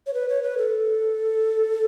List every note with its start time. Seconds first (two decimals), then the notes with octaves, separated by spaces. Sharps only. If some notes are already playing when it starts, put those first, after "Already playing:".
0.07 C#5
0.14 B4
0.29 C#5
0.43 B4
0.58 A4